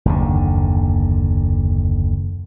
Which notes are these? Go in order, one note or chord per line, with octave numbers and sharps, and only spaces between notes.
F#1 D#2 D3